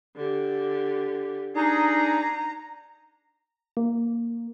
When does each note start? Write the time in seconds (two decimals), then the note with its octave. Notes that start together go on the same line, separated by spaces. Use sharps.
0.16 D3 G4
1.56 D4 D#4 G#4 A#5
3.77 A#3